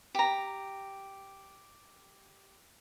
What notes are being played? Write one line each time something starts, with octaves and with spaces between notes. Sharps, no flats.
G4 A#5